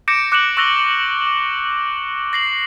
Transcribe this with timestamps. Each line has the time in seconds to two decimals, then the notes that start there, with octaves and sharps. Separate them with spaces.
0.08 D6 G6 A#6 C#7 D7 E7
0.32 D6 F#6 C#7 D7 E7 F#7
0.57 C#6 E6 F#6 A#6 F7 G7
1.27 D6
2.33 A#6 C7 F#7